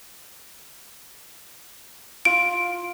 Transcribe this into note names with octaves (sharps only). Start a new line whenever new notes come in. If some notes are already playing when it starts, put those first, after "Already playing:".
F4 D7